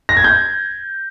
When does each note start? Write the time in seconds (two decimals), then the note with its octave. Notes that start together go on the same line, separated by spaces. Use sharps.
0.09 A#6
0.17 G#6
0.24 G6